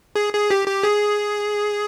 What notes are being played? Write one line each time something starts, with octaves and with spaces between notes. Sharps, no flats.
G#4
G#4
G4
G4
G#4